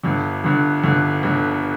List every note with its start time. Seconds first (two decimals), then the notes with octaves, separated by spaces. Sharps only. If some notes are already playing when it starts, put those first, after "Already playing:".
0.03 G1 G2 D3
0.44 G1 G2 D3
0.83 G1 G2 D3
1.23 G1 G2 D3